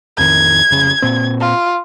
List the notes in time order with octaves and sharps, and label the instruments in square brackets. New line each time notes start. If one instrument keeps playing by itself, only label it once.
[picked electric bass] A1 F2 D#3 [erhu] G#6
[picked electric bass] F1 C#3
A#2 C4
[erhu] F4